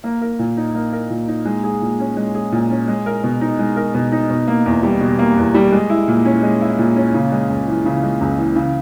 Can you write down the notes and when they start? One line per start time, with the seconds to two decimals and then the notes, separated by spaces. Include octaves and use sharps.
0.04 A#3
0.21 A#4
0.39 A#2
0.57 D#4
0.75 A#3
0.92 A#4
1.10 A#2
1.28 D#4
1.45 G#3
1.64 G#4
1.82 A#2
2.00 C#4
2.17 G#3
2.35 G#4
2.52 A#2
2.71 C#4
2.88 G#3
3.06 A#4
3.24 B2
3.41 D#4
3.59 G#3
3.76 A#4
3.94 B2
4.12 D#4
4.30 B2
4.48 A#3
4.66 E2
4.83 G3
5.01 B2
5.19 A#3
5.37 E2
5.54 G3
5.72 G#3
5.90 E4
6.08 A#2
6.25 C#4
6.43 G#3
6.61 E4
6.79 A#2
6.96 C#4
7.14 C#3
7.32 G#3
7.50 C#2
7.68 E3
7.85 C#3
8.03 G#3
8.21 C#2
8.38 E3
8.56 C#3